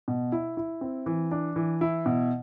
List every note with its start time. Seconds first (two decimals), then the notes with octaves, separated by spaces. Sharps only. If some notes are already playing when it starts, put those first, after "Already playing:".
0.08 B2
0.32 E4
0.57 E4
0.81 C4
1.06 E3
1.31 D4
1.56 E3
1.81 E4
2.06 B2